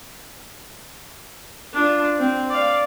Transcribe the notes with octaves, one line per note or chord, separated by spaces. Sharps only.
D4 F4
C4
D5 F5